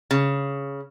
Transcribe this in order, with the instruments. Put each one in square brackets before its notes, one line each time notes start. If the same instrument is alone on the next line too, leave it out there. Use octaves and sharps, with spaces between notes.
[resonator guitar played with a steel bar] C#3